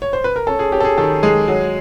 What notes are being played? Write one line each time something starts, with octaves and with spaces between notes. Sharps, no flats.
C#5
C5
B4
A#4
C#4 A4
G#4
C#4 G4
A4
G#4
D#3 A4
G#3 G#4
F#3